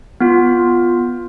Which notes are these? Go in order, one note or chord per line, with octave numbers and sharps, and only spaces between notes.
B3 F4